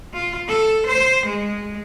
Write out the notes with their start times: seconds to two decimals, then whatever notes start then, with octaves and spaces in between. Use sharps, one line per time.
0.13 F4
0.48 A4
0.87 C5
1.26 G#3